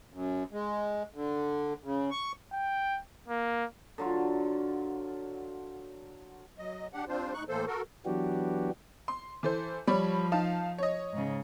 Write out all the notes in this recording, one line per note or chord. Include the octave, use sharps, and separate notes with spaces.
F#2
G#3
D3
C#3
C#6
G5
A#3
D3 F#3 F4
F#3 D#5
D4 G4 F#5
G3 C4 D4 F4 C5
A2 D#4 C#6 F#6
A2 E3 A#3 A4 C5
F#4 A4 A#4
E3 F#3 B3 D4 F#4 G4
C6
E3 A4 C5
F3 G3 C#5 B5
D#4 F5 A5
C#5 D#5
G#2 C#3